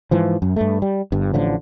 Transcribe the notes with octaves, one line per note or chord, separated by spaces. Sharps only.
G#2 E3 F3
F#2
G2 A3
G3
G1 G2
A1 A2 D3 F3